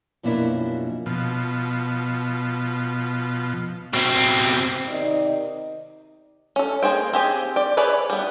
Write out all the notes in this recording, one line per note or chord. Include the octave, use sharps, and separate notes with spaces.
F#2 B2 F3 A#3 D4 E4
B2 F3
B2 C4
C3 D#3 D#4 D5 D#5
C#4 A4
A#3 F#4 G#4 C5 G5
C4 G4 G#4
D5 G5
G#4 B4 C#5 D5 E5
G3 B3